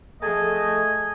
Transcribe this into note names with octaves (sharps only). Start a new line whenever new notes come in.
F2 A3 G#4 A4 D#5 G#5